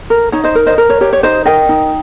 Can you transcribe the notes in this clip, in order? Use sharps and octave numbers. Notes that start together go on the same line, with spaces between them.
A#4
D#4 C#5
C5 D#5
A#4
C5 D#5
A#4
C#5
G4 C#5
C#5
D#4 C5 D#5
A#4 D#5 G5
D#4